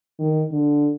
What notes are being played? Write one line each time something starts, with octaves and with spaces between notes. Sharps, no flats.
D#3
D3